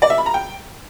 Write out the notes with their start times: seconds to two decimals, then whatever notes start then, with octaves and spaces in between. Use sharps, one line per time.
0.02 D5
0.10 E5
0.18 B5
0.26 A#5
0.34 G5